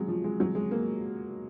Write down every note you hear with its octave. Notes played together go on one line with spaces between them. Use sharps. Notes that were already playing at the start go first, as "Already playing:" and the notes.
Already playing: F#3 G#3
F3
G#3
F#3
G#3
A#3